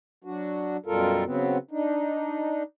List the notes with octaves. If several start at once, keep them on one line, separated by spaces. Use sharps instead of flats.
F#3 D4 F#4
F#2 B2 G3 F4 A4 A#4
C#3 F#3 B3 C4
D4 D#4